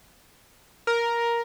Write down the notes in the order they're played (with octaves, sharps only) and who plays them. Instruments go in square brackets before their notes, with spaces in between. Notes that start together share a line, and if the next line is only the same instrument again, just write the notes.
[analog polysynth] A#4